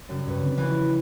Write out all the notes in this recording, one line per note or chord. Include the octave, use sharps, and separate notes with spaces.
F#2 C#3 G3
G2 G4 B4 C#5
D3 C4
E3 F3 G#3 C#5